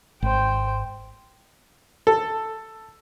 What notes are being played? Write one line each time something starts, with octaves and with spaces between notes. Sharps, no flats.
G#1 C5 G5
A4